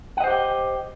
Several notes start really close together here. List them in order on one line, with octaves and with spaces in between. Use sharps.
F#5 D#5 C5 G4 G5